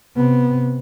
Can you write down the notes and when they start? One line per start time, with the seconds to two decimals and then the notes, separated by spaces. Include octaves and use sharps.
0.16 C3 B3